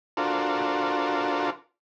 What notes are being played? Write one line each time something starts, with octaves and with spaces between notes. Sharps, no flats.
D4 F4 F#4 A4 A#4 C5